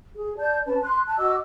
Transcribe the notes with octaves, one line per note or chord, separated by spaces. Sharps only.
G#4
D5 A5 G6
C#4 B4 A5
C6 F#6
A5 F#6
F#4 D#5 D6 E6